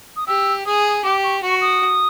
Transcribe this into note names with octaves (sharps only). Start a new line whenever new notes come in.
D#6
G4 E6
G#4 D#6
G4 D6
C#6
F#4 C#6
D#6